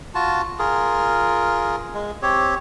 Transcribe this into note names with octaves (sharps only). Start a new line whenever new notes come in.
F4 F#4 A5
F4 G#4 A#4
G#3
C4 G4 C#5